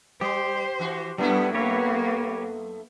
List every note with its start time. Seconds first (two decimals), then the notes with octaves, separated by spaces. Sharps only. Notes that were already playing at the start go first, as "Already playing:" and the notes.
0.21 G3 G4 C5
0.79 E3 F#4
1.18 F#2 G3 A3 B3 E4
1.54 A#3 B3 G4 B4 C#5